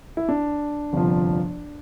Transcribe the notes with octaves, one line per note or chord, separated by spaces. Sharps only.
E4
D4
G1 F2 C3 F3